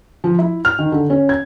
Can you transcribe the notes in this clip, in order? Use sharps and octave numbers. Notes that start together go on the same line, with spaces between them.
F3
E4
F6
D#3
D3
C#4
G#6